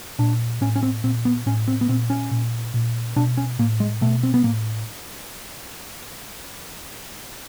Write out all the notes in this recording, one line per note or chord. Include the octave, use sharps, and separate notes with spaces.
A#2 D4
A2 C#4
C#4
C4
A#2 C4
B3
A2 C#4
C4
B3
A#2 C4
C#4
A#2
A#2
B2 D4
C#4
A2 A#3
G#3
B2 A3
C4
B3
A2 A#3